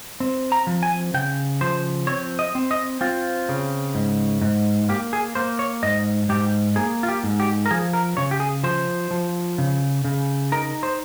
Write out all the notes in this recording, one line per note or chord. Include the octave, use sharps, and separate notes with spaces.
C4
A#5
F3
G#5
C#3 G5
F3 C5
C4 C#5
D#5
C4
D#5
C4 F4
C#3
G#2
G#2
A#3 G4
G#4
A#3 C5
C#5
G#2 D#5
G#2 G4
A#3 G#4
F4
G4
G#2
G4
A#4
F3 G#4
A#4
C#3 C#5
G4
G#4
F3 C5
F3
C#3
C#3
D#4 A#4
C5